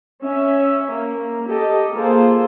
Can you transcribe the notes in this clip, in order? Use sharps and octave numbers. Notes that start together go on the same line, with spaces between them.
C#4 E5
A#3
G4 A4 D#5
A#3 F4 G#4 A4 C5